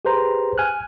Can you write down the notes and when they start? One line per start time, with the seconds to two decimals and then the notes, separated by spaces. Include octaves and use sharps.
0.05 G4 G#4 B4 C5 A#5
0.58 G#5 F6 F#6